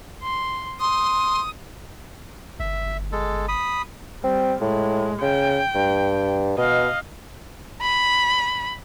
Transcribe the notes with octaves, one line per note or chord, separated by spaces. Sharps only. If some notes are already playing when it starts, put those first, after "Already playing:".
C6
C6 D#6
G1 E5
G#3 A4
B5 D#6
G3 C4
A2 G#3
C#3 G5
G2
B2 D#5 F5
B5